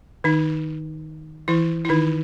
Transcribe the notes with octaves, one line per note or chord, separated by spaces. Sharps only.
D#3 D#4
E3 E4
E4
D#3 D#4